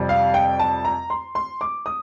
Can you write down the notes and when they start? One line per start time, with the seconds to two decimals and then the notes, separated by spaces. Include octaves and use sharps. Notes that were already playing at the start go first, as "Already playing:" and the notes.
Already playing: F2 C3 G3
0.09 F5
0.34 G5
0.59 A5
0.85 A#5
1.10 C6
1.35 C6
1.61 D6
1.86 D#6